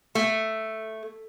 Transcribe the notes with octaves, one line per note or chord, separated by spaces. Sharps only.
A3